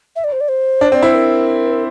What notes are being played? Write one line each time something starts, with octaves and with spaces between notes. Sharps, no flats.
E5
D5
C5
D5
C5
D4
C4 D5
E4 C5
A#4